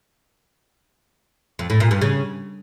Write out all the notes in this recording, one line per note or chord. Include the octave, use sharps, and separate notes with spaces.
F2
A2
A#2
G2
C#3